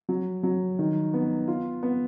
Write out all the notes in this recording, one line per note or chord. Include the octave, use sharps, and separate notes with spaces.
F#3
F#3
D#3
B3
F4
B3